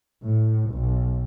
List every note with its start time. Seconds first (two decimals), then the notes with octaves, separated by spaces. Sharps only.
0.24 A2
0.71 B1